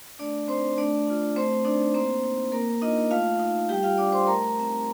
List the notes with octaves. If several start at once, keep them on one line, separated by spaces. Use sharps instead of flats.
A3 D4 D5
C4 D#4 C5
A3 D4 D5
D4 F4
A3 C4 C5
D4 D#4 D5
A#3 C4 C5
D#4
A#3 A#4
D4 D#4 F4 D#5
A3 F4 F5
D#4
G3 G4 G5
F4 F5
D4 F4 D5 D6
C5 C6
A3 A#4 A#5
C4 D#4